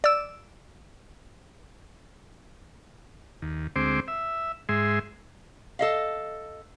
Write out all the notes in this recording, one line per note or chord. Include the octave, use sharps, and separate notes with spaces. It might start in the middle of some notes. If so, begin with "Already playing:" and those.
D5 E6
D#2
D2 G#3 C4 C5 D6
E5
G#2 G#3 G#4 E5 C6
A4 D#5 F5